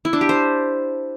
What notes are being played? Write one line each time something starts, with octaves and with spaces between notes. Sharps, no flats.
E4
D4
G4
C5